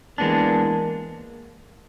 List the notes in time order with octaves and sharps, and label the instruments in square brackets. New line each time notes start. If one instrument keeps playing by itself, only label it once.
[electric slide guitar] E3 G#3 B3 D4 [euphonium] A#3